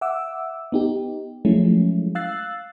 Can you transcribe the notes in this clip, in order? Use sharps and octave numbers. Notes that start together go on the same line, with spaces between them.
E5 F#5 D6 E6
B3 D#4 G4
F3 F#3 G#3 A3 C#4 E4
F5 E6 F#6 A6 C7